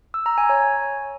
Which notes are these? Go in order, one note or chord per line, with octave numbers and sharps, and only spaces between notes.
E6
A#5
G#5
C#5